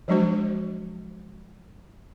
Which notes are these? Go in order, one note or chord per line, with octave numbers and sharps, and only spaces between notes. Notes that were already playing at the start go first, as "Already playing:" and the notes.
F3 F#3 G#3 D4 F#4 C5